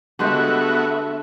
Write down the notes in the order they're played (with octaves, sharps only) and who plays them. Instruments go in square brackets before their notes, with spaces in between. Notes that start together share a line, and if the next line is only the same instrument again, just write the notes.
[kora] D3 G#3 G4 [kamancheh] A3 E5 [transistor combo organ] B3 F#4